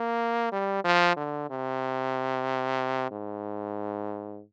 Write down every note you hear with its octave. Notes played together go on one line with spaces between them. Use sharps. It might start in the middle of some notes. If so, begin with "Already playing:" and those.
Already playing: A#3
G3
F3
D3
C3
G#2